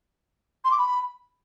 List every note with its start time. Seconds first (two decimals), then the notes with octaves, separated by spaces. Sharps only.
0.64 C6
0.71 D6
0.78 B5